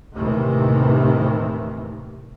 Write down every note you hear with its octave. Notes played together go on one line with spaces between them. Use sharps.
D#2 A2 C3 D#3 E3